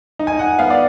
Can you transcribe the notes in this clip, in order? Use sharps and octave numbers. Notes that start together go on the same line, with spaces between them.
D#4
G#5
F#5
B3 F5
D5